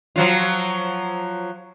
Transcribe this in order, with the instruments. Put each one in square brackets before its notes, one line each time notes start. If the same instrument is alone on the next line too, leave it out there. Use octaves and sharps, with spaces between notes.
[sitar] F3 F#3 F4